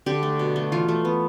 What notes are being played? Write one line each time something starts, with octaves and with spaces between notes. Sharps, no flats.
D3 G4
A3
B2
A3
E3 F4
A3
B3